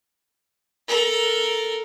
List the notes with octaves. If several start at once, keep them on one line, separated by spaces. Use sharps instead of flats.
A4 A#4